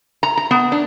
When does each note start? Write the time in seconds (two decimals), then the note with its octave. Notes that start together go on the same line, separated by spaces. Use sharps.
0.23 A#5
0.37 A#5
0.51 B3
0.72 D4